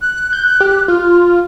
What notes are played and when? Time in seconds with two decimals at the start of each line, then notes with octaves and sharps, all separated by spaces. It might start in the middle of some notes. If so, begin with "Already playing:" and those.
0.02 F#6
0.33 G6
0.60 G4
0.88 F4 F6